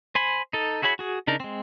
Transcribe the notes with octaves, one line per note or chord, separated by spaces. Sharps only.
C5 G#5 B5
D#4 A4
E4 F#4 G#4 C#5 B5
F#4 G#4
C#3 D4 D#4 A#4
G#3 C4